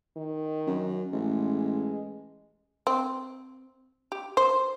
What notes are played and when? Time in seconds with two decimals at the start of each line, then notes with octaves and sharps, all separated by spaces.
0.16 D#3
0.67 F#2
1.13 A1 G#3
2.87 C4
4.12 G4
4.37 C5